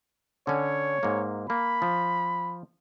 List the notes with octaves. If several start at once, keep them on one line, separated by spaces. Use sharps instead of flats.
D3 C#4 C#5
G#2 A#3
A#3 B5
F3